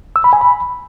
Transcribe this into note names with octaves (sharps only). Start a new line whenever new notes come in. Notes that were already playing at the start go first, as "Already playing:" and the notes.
E6
B5
G#5
B5